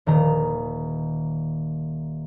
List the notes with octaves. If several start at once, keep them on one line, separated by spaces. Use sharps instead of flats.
D#1 D#3 A#5